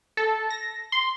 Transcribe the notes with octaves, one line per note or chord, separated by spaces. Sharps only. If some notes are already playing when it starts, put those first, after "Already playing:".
A4
A#6
C6